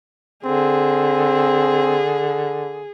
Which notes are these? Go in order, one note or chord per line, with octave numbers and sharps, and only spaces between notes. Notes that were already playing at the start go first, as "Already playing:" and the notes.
D3 C4 G#4